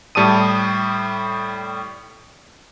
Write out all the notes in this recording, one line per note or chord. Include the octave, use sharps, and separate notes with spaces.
A2 G3 A5 D#6 D#7